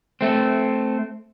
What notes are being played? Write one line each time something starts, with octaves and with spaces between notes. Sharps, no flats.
A3 C4